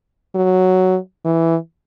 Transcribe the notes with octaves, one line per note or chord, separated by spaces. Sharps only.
F#3
E3